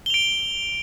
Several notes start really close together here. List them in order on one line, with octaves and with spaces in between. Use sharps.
G7 F7 D7